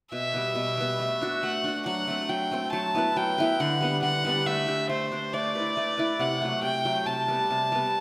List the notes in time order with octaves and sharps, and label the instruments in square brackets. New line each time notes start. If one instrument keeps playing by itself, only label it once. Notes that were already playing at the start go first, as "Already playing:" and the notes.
[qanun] B2 [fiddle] E5
[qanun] G3 B3
B2
G3 B3
A3
D4 F#4
[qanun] A3 [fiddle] F#5
[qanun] D4 F#4
[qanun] F#3 [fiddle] F#5
[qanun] A3 C4
[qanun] F#3 [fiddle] G5
[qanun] A3 C4
[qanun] F#3 [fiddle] A5
[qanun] B3 E4 B4
[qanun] F#3 [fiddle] G5
[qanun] B3 E4 B4
[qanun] D3 [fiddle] F#5
[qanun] G3 B3 D4
[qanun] D3 [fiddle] F#5
[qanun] G3 B3 D4
[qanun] A3 [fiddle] E5
[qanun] D4 G4
[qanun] A3 [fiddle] C5
[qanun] D4 G4
[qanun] A3 [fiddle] D5
[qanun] E4 B4
A3
E4 B4
[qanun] C3 [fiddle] F#5
[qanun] F#3 A3
[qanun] C3 [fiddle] G5
[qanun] F#3 A3
[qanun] C3 [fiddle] A5
[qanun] G3 B3
C3
G3 B3